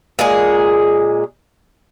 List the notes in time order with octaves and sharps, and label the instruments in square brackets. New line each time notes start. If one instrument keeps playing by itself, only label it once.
[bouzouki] A#2 G#3 G#4